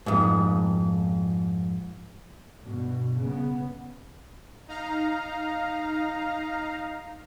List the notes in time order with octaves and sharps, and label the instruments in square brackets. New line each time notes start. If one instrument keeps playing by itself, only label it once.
[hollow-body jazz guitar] F2 G#2
[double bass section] G2 B2
C#3 B3
[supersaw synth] D#4 F5 A#5